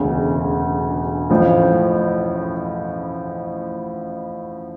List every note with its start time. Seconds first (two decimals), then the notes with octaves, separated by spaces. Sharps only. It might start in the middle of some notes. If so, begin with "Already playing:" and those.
Already playing: E1 D2 C#3
1.30 A1 A2 F3